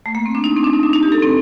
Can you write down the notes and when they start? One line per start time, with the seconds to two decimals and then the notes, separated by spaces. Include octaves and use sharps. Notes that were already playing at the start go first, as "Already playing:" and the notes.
0.06 A3
0.15 A#3
0.26 C4
0.35 D4
0.44 D#4
0.57 C4
0.64 D4
0.73 D#4
0.83 D4
0.93 D#4
1.03 G4
1.12 A4
1.22 C4